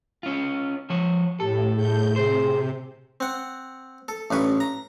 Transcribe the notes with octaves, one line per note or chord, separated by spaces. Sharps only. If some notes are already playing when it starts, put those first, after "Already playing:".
C#4 F4
F3 C#5
A2 G4 A4
A2 G#4 G6
C3 G#4 C5
C4 F#5
A4
A1 G2 B4 C#6
A#5